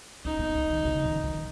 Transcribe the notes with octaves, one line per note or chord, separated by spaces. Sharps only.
C#4 D#4
B3
A3
D#3
C#3
D#3
D#3